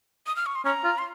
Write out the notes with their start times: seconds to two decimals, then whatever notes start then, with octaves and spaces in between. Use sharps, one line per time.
0.27 D#6
0.36 F6
0.46 C#6
0.55 C6
0.65 C#4 A#5
0.84 F4
0.98 C6